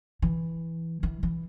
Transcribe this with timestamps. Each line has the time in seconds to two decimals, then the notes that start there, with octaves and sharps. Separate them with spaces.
0.22 E3
1.03 E3
1.23 E3